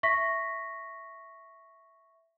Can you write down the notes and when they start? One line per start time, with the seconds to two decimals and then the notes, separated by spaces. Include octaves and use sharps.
0.03 E5 C#6 A#6 B6